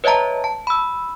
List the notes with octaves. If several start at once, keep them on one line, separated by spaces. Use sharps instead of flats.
B4 C#5 D#5 E5 A5 A#5
A5
B5 E6